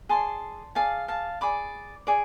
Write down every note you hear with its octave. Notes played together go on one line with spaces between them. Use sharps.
G#4 D5 A5 C6
G#4 D5 F5 A5
F5 A5
G#4 D5 B5 D6
G#4 D5